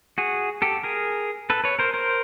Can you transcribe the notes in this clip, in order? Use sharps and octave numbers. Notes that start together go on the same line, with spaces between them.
F#4 G#4
G4 A4
G#4 A#4
A4 B4
B4 C#5
A#4 C5
A#4 C5